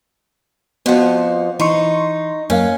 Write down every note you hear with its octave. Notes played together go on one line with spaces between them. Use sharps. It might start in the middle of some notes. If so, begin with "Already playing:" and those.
F2 F3 B3 F#4
E3 D#4 C6 C#6
F#2 A#3 C#4 F5